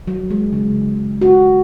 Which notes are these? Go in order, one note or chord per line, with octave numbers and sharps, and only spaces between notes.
F#3
G#3
C#3
F#4